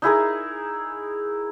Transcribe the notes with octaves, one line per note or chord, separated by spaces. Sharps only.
D#4 E4 G#4 A#4